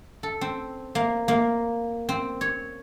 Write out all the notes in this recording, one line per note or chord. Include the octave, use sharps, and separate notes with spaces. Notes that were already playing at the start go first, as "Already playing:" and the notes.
A4
C4
A#3
A#3
C4
C#5